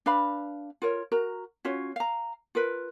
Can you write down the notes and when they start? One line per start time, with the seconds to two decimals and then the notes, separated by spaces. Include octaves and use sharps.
0.06 D4 B4 F5 B5
0.82 F4 A#4 C#5
1.12 F#4 A#4 A#5
1.65 C#4 F4 F#4 C#5
1.96 F5 A#5
2.55 F4 A#4 B4